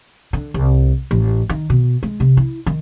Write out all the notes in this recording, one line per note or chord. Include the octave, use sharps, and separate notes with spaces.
D3
C2
A1
D#3
B2
G#3
C3
E4
D#3